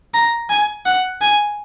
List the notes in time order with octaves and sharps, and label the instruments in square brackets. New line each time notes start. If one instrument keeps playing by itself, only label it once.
[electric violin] A#5
G#5
F#5
G#5